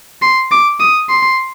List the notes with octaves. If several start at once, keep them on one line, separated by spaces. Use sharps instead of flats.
C6
D6
D#6
C6